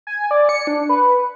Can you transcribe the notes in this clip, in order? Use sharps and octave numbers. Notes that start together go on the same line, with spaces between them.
G#5
D5
C#7
D4
B4